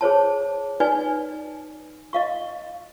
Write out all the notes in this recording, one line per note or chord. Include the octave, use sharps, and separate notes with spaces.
G#4 C5 C#5 A5
D#4 B4 D5 G#5
D#5 F5 C#6